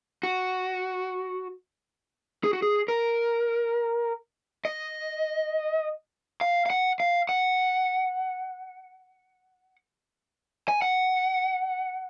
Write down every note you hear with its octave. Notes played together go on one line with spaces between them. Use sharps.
F#4
G#4
F#4
G#4
A#4
D#5
F5
F5
F#5
F5
F#5
G#5
F#5